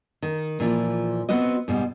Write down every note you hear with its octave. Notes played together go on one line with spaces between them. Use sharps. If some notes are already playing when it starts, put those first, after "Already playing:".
D#3
A#2 E3 F3
B3 C4 F#4 D#5
G#2 B2 G3